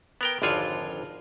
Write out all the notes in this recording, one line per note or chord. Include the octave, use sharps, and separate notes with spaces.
B3 A#4 G5
G#1 F2 D3 F4 G#4 C#5